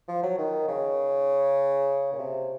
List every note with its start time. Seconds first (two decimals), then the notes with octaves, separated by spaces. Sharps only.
0.08 F3
0.23 F#3
0.38 D#3
0.68 C#3
2.13 A#2
2.18 C3